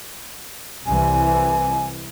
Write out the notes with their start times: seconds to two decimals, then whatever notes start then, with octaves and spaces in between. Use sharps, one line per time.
0.86 C2 E3 G#5